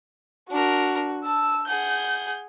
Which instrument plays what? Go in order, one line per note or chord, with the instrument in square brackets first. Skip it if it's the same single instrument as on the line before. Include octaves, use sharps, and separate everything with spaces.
[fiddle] D4 A#4 [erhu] F#4
[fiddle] A5 [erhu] E6
[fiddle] G#4 F#5 [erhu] G6